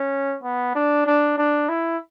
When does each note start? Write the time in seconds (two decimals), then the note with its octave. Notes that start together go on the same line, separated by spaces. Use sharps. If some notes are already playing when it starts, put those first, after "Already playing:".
Already playing: C#4
0.43 B3
0.75 D4
1.06 D4
1.38 D4
1.69 E4